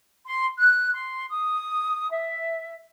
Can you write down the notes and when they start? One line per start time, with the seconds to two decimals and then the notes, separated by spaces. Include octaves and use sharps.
0.25 C6
0.57 F#6
0.93 C6
1.29 D#6
2.10 E5